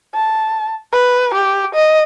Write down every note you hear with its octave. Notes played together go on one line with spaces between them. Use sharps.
A5
B4
G4
D#5